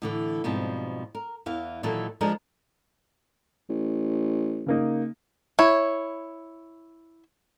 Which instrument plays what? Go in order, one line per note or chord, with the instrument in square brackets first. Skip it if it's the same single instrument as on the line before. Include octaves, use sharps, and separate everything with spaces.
[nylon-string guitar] A2 D3 E3
G#2 B2 F3 G3 C4
A#4
E2 E3 F5
A#2 D#3 E3 F#3 A#3 A4
F3 G#3 D4 G#4 A#4
[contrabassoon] A1
[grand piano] C#3 A#3 D#4
[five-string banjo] E4 C#5